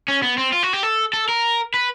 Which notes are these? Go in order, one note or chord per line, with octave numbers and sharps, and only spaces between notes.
C#4
B3
C4
F4
F#4
G4
A4
A4
A#4
B4